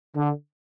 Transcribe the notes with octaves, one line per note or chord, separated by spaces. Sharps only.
D3